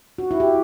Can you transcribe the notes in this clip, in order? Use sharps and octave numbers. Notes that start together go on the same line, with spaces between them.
F#4
E4
G4